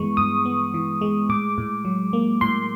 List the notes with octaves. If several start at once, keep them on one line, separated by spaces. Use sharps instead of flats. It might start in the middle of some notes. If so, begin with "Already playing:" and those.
Already playing: G2 E3 G#3 B3 C#6
G2 D#6
B3
E3
G#3
A2 D6
A2
F#3
A#3
A2 C6